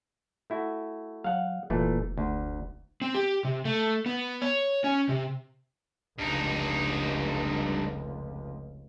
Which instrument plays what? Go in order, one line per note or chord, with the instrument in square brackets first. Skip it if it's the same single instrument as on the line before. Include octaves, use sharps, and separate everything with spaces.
[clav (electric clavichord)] A3 E4 F#4
[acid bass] F#3 [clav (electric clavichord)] F5 F#5
[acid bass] F1 [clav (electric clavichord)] A#2 E3 A3
[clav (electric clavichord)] D2
[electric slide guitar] C4
G4
C3
A3
B3
C#5
C#4
C3
[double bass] F1 C#2 [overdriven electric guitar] G2 D#4